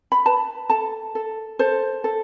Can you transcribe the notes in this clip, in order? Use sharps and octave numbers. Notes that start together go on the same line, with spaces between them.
B5
B4 A5
A4 A5
A4
A4 C5
A4